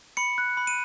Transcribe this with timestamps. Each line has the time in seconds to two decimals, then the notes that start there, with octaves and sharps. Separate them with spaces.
0.17 B5 C#7
0.38 F#6
0.57 B5
0.67 D#7